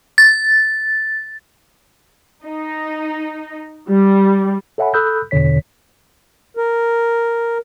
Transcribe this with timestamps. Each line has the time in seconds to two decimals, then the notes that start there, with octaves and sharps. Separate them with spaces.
0.18 A6
2.44 D#4
3.88 G3
4.78 A4 C#5 E5 F#5 G#5 B5
4.94 A4 B5 D#6 E6 F#6 G6
5.31 E2 B2 D3 C#5 B6
6.57 A#4